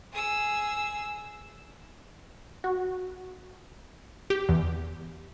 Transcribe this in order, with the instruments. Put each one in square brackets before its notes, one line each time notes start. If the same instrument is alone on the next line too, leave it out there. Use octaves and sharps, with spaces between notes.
[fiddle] G#4 E6
[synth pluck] F#4
G4
E2